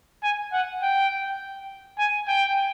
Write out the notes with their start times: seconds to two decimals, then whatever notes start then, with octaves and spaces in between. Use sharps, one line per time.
0.23 G#5
0.53 F#5
0.82 G5
1.98 G#5
2.28 G5